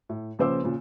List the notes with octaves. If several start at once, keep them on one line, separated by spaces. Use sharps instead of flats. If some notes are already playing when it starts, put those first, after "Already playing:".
A2
A#1 C#3 B4 C5 D6 E6
A#2 C#3